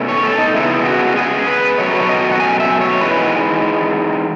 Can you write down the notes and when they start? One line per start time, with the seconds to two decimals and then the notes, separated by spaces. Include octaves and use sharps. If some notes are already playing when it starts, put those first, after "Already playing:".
Already playing: B2 A3 C#4
0.09 C#5
0.23 A4
0.38 D#4
0.54 C#3 G#3 B3 E4
0.85 F#4
1.16 G#4
1.47 B4
1.78 B2 F#3 A3 C#4 C#5
1.91 B4
2.01 C#5
2.09 D#5
2.32 F#5
2.40 G#5
2.60 E5
2.81 C#5
3.01 G#2 E3 G#3 B4